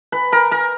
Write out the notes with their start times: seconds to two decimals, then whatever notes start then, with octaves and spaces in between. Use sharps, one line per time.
0.12 B4
0.32 A#4
0.51 A#4